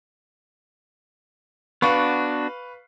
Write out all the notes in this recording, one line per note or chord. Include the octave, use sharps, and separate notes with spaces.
B3 D4 F#4 B4 F5 C#6